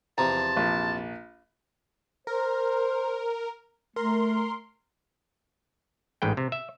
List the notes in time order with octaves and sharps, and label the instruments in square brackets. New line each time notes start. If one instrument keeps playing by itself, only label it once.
[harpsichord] E2 C3 F3 [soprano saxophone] A5 [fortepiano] A#5
[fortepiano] A#1
[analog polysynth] A#4 [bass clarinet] C5
[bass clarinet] A3 [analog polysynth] A#4 C6
[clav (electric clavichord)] A1 G#2 B4 G5
C3
E5